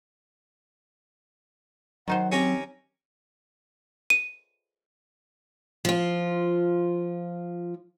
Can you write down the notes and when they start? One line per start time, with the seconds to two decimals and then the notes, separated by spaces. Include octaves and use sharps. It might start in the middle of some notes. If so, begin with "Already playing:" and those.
2.08 D#3 F#3 D#4 C5 F#5
2.32 C4 C#4 G4 A#5
4.10 D#7
5.85 F3 F4